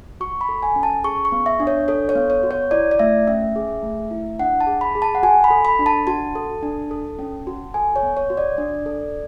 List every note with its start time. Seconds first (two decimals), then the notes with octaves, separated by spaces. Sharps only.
0.20 F#4 C#6
0.41 B5
0.49 A4
0.63 G#5
0.76 C#4
0.83 A5
1.04 G#4 C#6
1.25 C#6
1.32 B3
1.46 E5
1.60 D4
1.67 C#5
1.88 A4 C#5
2.09 C#5
2.15 B3
2.30 C#5
2.43 F#4
2.51 C#5
2.71 E4 D5
2.91 D5
2.99 A3 E5
3.27 C#4 E5
3.56 G#4
3.83 A3
4.11 E4
4.39 D4 F#5
4.61 A5
4.67 G#4
4.81 B5
4.95 G#4
5.02 A5
5.15 F#5
5.23 F#4 G#5
5.44 B5
5.50 A4
5.65 B5
5.79 D4
5.86 A5
6.07 F#4 A5
6.35 A4
6.63 D4
6.91 A4
7.19 C#4
7.47 F#4
7.74 A4 G#5
7.96 C#5
8.03 B3
8.17 C#5
8.30 F#4
8.37 D5
8.58 D4
8.86 A4